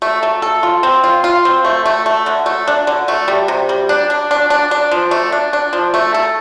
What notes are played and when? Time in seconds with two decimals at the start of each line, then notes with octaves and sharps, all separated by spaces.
0.02 A3
0.23 A3
0.42 A4
0.63 F4
0.83 C4
1.04 F4
1.24 F4
1.45 C4
1.65 A3
1.86 A3
2.06 A3
2.26 D3
2.46 A3
2.68 D4
2.87 D3
3.08 A3
3.28 G3
3.48 C3
3.69 G3
3.89 D4
4.10 D4
4.31 D4
4.50 D4
4.71 D4
4.91 F3
5.11 A3
5.32 D4
5.53 D4
5.73 F3
5.94 A3
6.14 A4